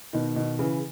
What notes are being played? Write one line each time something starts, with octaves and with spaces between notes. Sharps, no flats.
B2 D#3
B2 D#3
C#3 E3